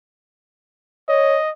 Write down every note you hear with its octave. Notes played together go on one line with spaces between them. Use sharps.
C#5 D#5